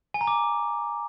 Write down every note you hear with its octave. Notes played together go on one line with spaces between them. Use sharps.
G#5
A#5
D6